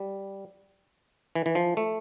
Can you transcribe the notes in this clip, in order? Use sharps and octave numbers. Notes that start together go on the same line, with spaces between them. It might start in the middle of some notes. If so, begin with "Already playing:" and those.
Already playing: G3
E3
E3
F3
A3